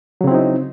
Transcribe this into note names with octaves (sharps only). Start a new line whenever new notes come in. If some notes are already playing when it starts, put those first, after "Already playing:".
C#3 F#3 C4 D#4 E4